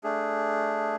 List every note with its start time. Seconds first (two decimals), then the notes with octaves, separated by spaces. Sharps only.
0.04 A3 D4 G#4